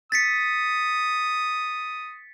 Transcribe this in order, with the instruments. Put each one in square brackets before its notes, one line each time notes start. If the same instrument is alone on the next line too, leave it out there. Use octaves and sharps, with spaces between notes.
[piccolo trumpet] D#6 [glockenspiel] A6 B6 C#7